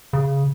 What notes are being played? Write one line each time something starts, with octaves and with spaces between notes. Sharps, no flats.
C#3